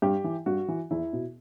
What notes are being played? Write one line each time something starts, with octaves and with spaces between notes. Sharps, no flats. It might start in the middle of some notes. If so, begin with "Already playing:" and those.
G2 G4
E3
G2 F#4
E3
E2 E4
B2